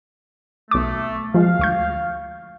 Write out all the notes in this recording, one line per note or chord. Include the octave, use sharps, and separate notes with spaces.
B1 A3 D6
F3 G#3 F5
D2 C#6 G6